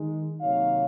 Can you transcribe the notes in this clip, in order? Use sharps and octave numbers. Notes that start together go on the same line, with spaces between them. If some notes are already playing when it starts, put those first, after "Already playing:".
Already playing: D#3 G#3 D#4
C3 D#3 F#3 A#3 D#4 C#5 F5